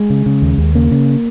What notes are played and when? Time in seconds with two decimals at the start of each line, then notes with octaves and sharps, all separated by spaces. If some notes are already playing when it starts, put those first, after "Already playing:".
Already playing: G#3
0.10 C#3
0.26 C#3
0.42 D#2
0.58 D#2
0.75 C#3 A#3
0.91 C#3